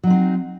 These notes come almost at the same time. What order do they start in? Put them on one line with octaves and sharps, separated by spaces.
F#3 D#4 C4